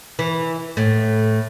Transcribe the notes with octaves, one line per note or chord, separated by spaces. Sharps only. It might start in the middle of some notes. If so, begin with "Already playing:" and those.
E3
A2